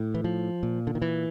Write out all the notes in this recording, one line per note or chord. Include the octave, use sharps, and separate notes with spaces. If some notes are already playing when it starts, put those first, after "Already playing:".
Already playing: A2
E3
F3
A#2
D3
D#3
E3